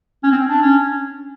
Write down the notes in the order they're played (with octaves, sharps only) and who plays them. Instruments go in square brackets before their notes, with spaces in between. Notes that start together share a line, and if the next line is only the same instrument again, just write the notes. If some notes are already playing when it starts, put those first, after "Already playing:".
[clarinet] C#4
C4
D4
C#4